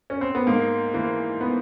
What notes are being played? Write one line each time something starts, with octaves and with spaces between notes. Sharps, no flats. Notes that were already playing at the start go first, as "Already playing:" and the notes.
C#4
C4
B3
G#2 A#3
E3 A#3
B3